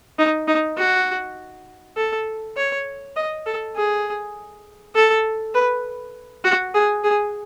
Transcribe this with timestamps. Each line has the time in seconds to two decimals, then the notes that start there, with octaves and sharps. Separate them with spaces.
0.19 D#4
0.48 D#4
0.77 F#4
1.97 A4
2.57 C#5
3.16 D#5
3.46 A4
3.76 G#4
4.95 A4
5.54 B4
6.44 F#4
6.74 G#4
7.04 G#4